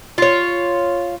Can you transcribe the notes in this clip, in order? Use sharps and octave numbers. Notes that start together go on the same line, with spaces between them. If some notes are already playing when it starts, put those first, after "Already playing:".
F4 C#5